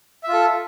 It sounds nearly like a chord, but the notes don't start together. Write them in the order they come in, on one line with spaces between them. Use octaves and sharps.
E5 F4 A4